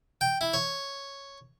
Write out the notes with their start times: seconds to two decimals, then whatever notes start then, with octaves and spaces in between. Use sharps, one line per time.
0.21 G5
0.41 E4
0.54 C#5